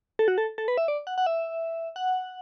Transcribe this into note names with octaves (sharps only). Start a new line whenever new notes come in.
A4
F#4
A4
A4
B4
E5
D5
F#5
F#5
E5
F#5